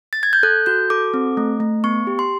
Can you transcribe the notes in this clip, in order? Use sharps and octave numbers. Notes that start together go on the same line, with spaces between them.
A6
G#6
G6
A4 F#6
F#4 G6
A4 D6
C4
A3
A3
B3 C#6
G4
C6